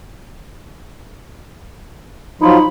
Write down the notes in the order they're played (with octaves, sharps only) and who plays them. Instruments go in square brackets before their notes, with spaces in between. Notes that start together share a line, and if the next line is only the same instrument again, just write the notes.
[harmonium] F3 F#3 F4 [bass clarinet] D#4 [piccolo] B5